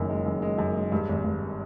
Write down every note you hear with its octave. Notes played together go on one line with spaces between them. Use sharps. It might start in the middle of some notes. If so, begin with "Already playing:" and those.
Already playing: F#1 F#2 D#3
G#3
F#2
G#3
F#2
G#3
G2
G#1
G2